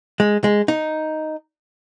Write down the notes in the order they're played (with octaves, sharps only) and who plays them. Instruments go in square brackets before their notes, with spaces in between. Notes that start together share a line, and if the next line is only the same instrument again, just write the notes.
[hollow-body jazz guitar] G#3
G#3
D#4